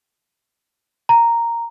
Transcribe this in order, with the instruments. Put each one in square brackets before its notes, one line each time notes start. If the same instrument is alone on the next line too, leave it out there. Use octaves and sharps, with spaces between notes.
[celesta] A#5